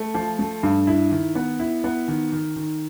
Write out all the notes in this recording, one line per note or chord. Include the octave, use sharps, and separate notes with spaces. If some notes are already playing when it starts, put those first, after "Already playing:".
Already playing: A3
F3
A3
G2
E4
D#3
B3
E4
B3
D#3
D#3
D#3